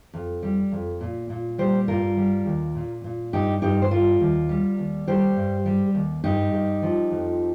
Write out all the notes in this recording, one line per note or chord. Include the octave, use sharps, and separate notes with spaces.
F2
G3
F2
A#2
A#2
G3 G4 C5
G2 F4 A#4
G3
D#2
A#2
A#2
G2 D#4 G4
G2 D#4 G4
C5
G3 F4 A#4
D#2
G3
D#2
G3 G4 C5
G2
G3
D#2
G2 D#4 G4
G2
F3
F2